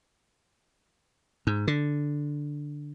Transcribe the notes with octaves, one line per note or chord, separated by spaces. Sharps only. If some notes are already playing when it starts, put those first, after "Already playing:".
G#2
D3